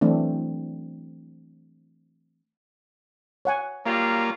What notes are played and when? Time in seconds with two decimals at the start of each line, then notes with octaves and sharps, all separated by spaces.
0.01 E3 F#3 A3 C4 D4
3.45 C#5 F#5 G#5
3.86 F#3 G3 A#3 F4